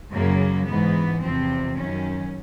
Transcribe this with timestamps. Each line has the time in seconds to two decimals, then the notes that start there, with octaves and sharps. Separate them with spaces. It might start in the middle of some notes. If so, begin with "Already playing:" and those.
0.13 F#2 C#3 F#3 A#3
0.67 G#2 E3 B3
1.22 E2 C3 F3 C4
1.76 F#2 D#3 F#3 C#4